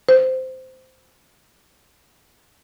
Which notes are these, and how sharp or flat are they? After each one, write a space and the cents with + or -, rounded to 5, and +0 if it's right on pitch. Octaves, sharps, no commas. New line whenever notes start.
C5 -10